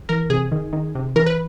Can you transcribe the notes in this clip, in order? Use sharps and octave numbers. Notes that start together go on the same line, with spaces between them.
E3 A#4
C3 G#4
D#3
D#3
C3
E3 A#4
B4